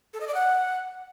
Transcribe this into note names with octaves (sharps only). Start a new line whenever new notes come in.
A4
D#5
D5
F#5